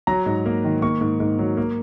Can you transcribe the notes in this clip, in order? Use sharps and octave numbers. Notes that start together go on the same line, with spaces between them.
F#3 A#5
G#2
A#3
D#3
A#3 C#6
G#2
G#2
F#3
A#3